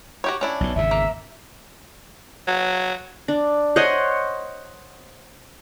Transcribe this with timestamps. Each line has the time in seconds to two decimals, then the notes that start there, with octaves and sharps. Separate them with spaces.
0.24 F#4 G4 C#5
0.41 C#4 D4 E4
0.60 B1 B2
0.75 G#1 E2 C#3 E5
0.91 A#3
2.48 F#3
3.28 D4
3.76 C5 C#5 D#5 F#5